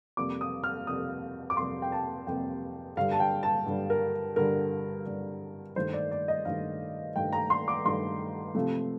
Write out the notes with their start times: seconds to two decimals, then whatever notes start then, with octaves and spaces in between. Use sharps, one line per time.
0.17 F2 C3 G3 A#3 D6
0.41 D#6
0.64 F6
0.87 F2 C3 G3 A#3 D#6
1.50 D6
1.57 F2 C3 G3 A#3 C6
1.82 G5
1.92 A5
2.27 F2 C3 G3 A#3 G5
2.97 G2 D3 G3 F5
3.12 A5
3.20 G5
3.43 A5
3.66 G2 D3 G3
3.90 A#4
4.36 G2 D3 G3 A#4
5.06 G2 D3 G3
5.76 G2 D#3 A3 C5
5.93 D5
6.11 D5
6.28 D#5
6.45 G2 D#3 A3 F5
7.16 G2 D#3 A3 G5
7.33 A#5
7.50 C6
7.68 D6
7.85 G2 D#3 A3 C6
8.55 C3 F3 A3